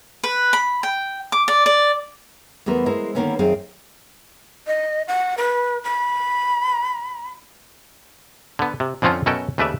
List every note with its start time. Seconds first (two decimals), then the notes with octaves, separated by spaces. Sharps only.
0.23 B4
0.53 B5
0.83 G5
1.32 D6
1.48 D5
1.66 D5
2.66 E2 A3 B3 A#4 C5
2.86 G#3 E4 A#4 C5
3.15 D3 D#3 F#3 A#3 B3 C#4
3.39 F#2 D#3 C4 G#4 F5
4.67 D#5
5.08 F#5
5.38 B4
5.84 B5
8.59 D3 B3
8.80 C3
9.02 F2 D3 F3 C4 C#4 F4
9.26 F#2 B2 C#4 F#4 A4 G5
9.58 D#2 C#3 A3 B4 D5 E5